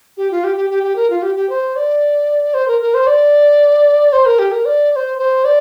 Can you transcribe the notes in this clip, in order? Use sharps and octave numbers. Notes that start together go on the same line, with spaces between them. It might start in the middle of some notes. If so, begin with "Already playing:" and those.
G4
F4
G4
G4
G4
G4
A#4
F4
G4
G4
C5
D5
C5
A#4
A#4
C5
D5
C5
A#4
G4
A#4
D5
D5
C5
C5
D5